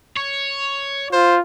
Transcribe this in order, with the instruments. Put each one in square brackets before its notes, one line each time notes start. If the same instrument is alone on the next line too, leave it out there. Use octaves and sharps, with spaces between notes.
[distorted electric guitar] C#5
[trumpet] F4 [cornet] C5